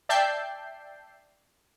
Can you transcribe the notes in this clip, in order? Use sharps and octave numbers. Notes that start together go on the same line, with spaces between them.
D5 E5 G5 A5 G6 C7